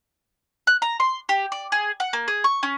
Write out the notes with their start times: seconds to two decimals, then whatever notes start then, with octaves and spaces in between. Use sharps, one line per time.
0.67 F#6
0.82 A#5
1.00 C6
1.29 G4
1.52 D5
1.72 G#4
2.00 F#5
2.13 A#3
2.28 G#4
2.44 C#6
2.63 C#4